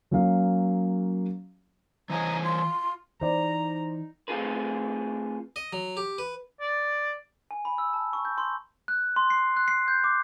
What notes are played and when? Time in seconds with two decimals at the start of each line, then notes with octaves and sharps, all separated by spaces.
0.11 F#3 A#3 C#4 F5
2.10 E3 C5 C#5 D#5 G#5 A#5
2.44 F4 C6
3.21 E3 D#4 C5 D5 A#5
4.28 A3 C4 F4 G#4 B4
5.56 D#5
5.73 F#3
5.97 G4
6.18 B4
6.60 D5
7.51 G#5
7.65 B5
7.78 E6
7.93 A5
8.13 C#6
8.25 G6
8.38 C6
8.88 F#6
9.16 C6
9.30 C7
9.57 F#6
9.68 C7
9.88 G6
10.04 D6